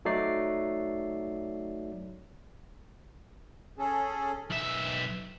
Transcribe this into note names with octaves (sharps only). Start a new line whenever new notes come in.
F#3 A3 D#4 D5 C7
C#4 G#4 A4
B1 E5